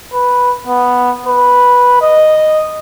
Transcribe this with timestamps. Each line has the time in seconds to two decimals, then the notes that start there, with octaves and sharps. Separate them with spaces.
0.14 B4
0.67 B3
1.26 B4
2.02 D#5